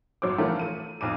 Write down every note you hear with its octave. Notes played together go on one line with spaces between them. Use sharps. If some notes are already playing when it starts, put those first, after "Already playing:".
G1 F#3 C5 D6
E3 F3 A3 C#4 A#4
D#7
B1 F2 D6 D#7